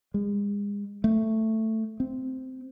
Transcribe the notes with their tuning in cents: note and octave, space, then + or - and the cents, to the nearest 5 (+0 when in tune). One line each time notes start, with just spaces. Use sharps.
G#3 -35
A3 +5
C4 -10